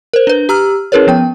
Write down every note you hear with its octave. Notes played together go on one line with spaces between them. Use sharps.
A#4 C5
D4 B4
G4 A#5 E6 F6
C#4 E4 G#4 A#4 B4 C#5
F3 B3 G5